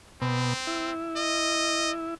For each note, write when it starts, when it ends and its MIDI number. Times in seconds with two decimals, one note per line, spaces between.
0.22 0.53 47
0.22 0.92 60
0.67 2.14 64
1.17 1.91 75